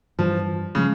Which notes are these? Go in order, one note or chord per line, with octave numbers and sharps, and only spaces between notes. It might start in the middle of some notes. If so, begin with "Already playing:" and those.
G2 E3 F3 G3
C#3 F3 G#3